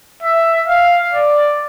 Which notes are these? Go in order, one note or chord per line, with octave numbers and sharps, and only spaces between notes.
E5
F5
D5